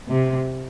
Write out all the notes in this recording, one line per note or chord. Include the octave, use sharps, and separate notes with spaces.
C3